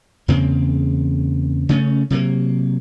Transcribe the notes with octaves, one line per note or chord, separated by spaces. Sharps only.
E2 C#3 A#3 C4
C#3 A3 C#4
C3 F#3 A#3